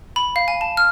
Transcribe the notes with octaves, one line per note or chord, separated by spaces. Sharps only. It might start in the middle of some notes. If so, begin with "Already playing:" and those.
B5
F5
G#5
A5
F6